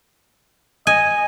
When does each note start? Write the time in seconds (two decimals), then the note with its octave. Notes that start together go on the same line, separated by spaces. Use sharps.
0.87 D#5 G#5